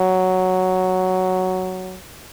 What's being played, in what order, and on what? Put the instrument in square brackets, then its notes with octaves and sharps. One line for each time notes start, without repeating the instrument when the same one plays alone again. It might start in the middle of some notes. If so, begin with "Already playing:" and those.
Already playing: [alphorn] F#3